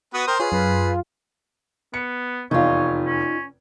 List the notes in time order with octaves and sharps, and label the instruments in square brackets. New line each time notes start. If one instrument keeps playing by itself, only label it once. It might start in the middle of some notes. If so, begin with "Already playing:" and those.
[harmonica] B3 F#4 B4 [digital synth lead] D#6
[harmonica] A#4 C5 [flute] G5
[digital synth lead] F4 [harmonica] G#4 [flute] B4 [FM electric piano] C#5
[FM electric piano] F#2 [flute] B4
[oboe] B3 [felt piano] C#7
[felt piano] F1 E2 [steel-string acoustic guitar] D#4 F4 [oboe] C#5
[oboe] C#4